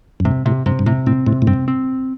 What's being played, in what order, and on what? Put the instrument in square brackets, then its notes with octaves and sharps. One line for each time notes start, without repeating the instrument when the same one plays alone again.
[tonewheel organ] F#2
[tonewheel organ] G2 [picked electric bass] C3
[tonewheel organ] A2 [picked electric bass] C3
[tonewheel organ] G2 [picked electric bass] C3
[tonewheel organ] G2
[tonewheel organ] A2 [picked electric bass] C3
[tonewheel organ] A2 [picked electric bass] C4
[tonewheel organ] A2 [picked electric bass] C3
[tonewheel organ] A2
[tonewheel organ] G2 [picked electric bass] C4
[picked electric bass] C4